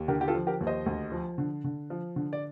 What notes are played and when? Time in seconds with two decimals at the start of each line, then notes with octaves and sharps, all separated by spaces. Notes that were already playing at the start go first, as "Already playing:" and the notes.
Already playing: D#2
0.08 D3 G4 A#4
0.21 G4
0.28 F4 A4
0.35 F3
0.47 G4 A#4
0.61 D#2
0.67 C5 D#5
0.86 D2
1.12 F3
1.38 D3
1.64 D3
1.90 F3
2.16 D3
2.33 D5